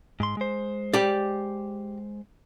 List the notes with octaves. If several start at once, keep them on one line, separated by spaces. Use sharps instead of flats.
G#2 C6
G#3 C5
G4 D5